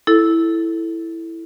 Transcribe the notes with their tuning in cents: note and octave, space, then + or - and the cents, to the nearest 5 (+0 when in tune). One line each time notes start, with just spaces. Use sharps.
E4 +0 A4 +0